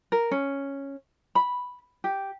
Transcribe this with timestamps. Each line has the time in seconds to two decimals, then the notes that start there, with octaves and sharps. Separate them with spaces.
0.12 A#4
0.31 C#4
1.35 B5
2.04 G4